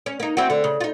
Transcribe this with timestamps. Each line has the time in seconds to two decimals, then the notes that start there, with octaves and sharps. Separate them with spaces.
0.06 C#4
0.20 A#3 D#4
0.37 C4 E4 F#4
0.50 D3
0.64 C#3
0.80 D#4 F4